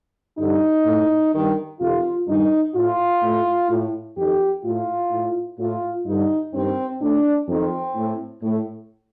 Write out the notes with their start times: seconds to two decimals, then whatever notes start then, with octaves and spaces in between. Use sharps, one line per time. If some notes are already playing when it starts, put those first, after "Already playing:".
0.38 G2 D3 D#4
0.85 A2
1.33 G2 D#3
1.80 F2 C3 D#3 F4
2.28 G2 D#3 D#4
2.75 A2 F4
3.22 A2
3.70 A2
4.17 F2 D#3 G4
4.64 A2 F4
5.11 A2
5.59 A2 F4
6.06 G2 D3 D#4
6.53 G2 D#3 C4
7.01 A2 D4
7.48 F2 D#3 C4
7.96 A2
8.43 A2